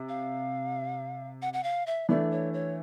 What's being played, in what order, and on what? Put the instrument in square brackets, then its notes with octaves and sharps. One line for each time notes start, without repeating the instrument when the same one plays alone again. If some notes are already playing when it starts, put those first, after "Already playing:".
Already playing: [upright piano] C3
[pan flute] F5
F#5
F#5
F5
E5
[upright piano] E3 A3 D4 [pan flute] D5
[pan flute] C#5
C#5